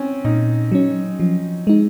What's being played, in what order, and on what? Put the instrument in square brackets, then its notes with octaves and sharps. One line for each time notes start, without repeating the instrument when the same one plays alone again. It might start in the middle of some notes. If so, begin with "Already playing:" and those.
Already playing: [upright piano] C4 C#4
[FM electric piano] A#2 [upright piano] D#4
[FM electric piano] F#3 C#4
F3
G#3 D#4